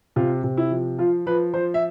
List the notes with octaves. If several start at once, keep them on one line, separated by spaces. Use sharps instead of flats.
C3 F4
C3
E4
F3
F3 F4
F3 B4
F3 C5
E5